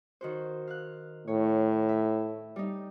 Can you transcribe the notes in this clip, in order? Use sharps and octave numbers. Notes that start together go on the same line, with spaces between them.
D#3 F#4 C5
F5 F#6
A2 C#5
E5
G3 D#4